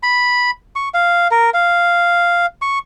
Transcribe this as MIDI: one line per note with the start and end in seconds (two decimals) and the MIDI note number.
0.03 0.51 83
0.76 0.89 85
0.94 1.28 77
1.31 1.50 70
1.54 2.46 77
2.62 2.79 85